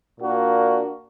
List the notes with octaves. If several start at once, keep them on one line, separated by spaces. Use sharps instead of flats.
A#2 A#3 D4 F#4